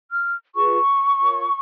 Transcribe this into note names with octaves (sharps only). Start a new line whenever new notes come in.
F6
F4 G#4 B4 C#6
F4 A#4 C#5